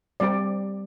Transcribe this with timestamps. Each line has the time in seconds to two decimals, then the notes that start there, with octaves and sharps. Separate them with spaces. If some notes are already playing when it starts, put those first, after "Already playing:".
0.20 G3 C4 G4 D5